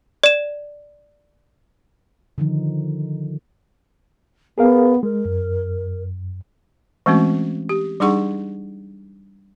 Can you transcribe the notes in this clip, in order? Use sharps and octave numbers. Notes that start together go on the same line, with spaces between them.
D5 E7
D3 D#3 F3 D#4
B3 G#4 A#4 F5
G#3 A#4
F#2
E3 G#3 A3 C4 C#4 F#4
G4
G3 D4 D#4 G#4 F#5 C#6